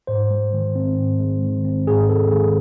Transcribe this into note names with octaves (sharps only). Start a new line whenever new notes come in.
G#2 C5
G#3
D#3
C4
G#2
G#3
D#3
C4
G#2 G#4
G#3 A4
D#3 G#4